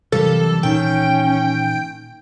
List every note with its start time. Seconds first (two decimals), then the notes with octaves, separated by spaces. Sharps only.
0.12 C3 E3 F#3 G3 A#3 A4
0.63 A#2 D#3 E3 C#4 G5